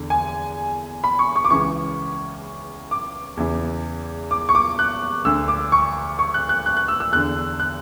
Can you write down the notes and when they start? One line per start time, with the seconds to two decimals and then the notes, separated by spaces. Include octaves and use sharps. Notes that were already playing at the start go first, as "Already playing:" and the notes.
Already playing: E2 D3
0.10 G#5
1.04 B5
1.19 C#6
1.36 C#6
1.44 D6
1.50 C#2 C#3 E3 C#6
2.91 D6
3.37 E2 C#3 E3
4.31 D6
4.49 C#6
4.55 D6
4.79 F#6
5.25 D2 D3 E6
5.48 D6
5.72 C#6
6.19 C#6
6.34 F#6
6.49 F#6
6.66 F#6
6.77 F#6
6.88 E6
7.00 E6
7.12 E2 D3 F#6
7.60 F#6